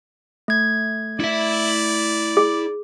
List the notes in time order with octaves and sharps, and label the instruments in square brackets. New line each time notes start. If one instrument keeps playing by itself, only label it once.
[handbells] A3 G#6
[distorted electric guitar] E4 E5 [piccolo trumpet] D5
[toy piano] G#4